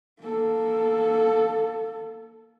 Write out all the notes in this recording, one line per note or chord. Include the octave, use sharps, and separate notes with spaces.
A#3 A4